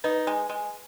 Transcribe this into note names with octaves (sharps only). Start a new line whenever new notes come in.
D#4 B4
G#3
G#3